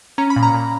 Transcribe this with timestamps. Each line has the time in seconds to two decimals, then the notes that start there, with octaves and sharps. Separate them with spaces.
0.18 C#4 A#5
0.30 B5
0.36 A#2
0.43 A#5
0.54 A#2